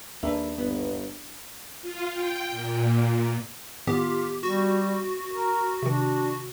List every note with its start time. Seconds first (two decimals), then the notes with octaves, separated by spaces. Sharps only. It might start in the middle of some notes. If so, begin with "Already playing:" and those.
0.23 D#2 A#3 D4 G#4 B4 E5
0.58 G1 B3
1.82 F4
2.12 G5
2.50 A#2
3.87 A2 D#3 B3 F4 G4
4.43 G3 F#4
5.33 A#4
5.82 C3 D#3 D4